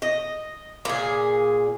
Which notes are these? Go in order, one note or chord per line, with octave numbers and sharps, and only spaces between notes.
D#5
A#2 G#4